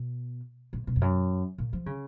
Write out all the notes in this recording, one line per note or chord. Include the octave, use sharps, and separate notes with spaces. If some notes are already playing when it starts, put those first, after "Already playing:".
Already playing: B2
A#2
B2
F2
F#2
A#2
F3
C#3